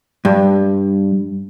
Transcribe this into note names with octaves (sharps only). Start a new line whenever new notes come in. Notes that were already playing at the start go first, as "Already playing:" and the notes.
G2